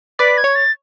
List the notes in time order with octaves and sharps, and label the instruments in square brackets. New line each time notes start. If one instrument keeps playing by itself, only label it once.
[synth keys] B4 D5 [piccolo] B6
[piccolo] G#6
[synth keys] C#5
[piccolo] A6